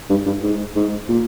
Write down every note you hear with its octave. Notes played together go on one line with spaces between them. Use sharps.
G2
G2
G#2
G#2
A#2